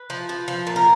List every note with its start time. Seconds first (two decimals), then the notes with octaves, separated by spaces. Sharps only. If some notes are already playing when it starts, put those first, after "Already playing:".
Already playing: B4
0.10 F3
0.29 F3
0.48 F3
0.67 A#2
0.76 A#4